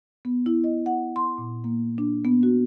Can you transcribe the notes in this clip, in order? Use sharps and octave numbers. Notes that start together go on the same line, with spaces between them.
B3
E4
D#5
F#5
C6
A#2
A#3
D4
B3
F#4